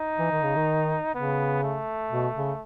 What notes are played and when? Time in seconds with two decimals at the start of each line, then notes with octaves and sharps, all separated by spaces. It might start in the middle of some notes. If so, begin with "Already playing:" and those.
Already playing: D#4
0.18 E3
0.31 D#3
0.43 C#3
0.56 D#3
1.15 C#3 B3
1.63 A3
2.11 B2
2.35 C#3